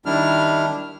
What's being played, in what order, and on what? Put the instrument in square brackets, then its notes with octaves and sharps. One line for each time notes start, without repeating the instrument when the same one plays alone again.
[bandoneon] D#3 G3 D4 E4 F6